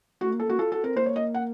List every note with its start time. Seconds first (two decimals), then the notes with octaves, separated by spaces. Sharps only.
0.21 A3 F#4
0.33 A#3
0.40 A4
0.46 A#3 F#4
0.59 F4 A4
0.72 F#4 A4
0.84 C4 A#4
0.96 A#3 C5
1.06 C#5
1.16 D#5
1.34 F#5